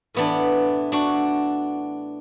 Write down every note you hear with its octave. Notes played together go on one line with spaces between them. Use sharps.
A2 E3 B3 D4
D4 F#4